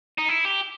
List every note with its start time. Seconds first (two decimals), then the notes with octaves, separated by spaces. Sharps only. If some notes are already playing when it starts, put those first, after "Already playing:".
0.18 D#4
0.29 E4
0.45 G4